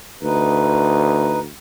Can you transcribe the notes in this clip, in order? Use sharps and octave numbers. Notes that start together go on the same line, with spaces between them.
D2 D#4 B4